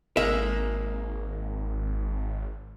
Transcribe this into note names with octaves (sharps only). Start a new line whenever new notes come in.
G#1 G#3 A#3 A#4 E5